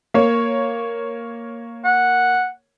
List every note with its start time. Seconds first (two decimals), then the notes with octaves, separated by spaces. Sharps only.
0.14 A#3 C#5
1.84 F#5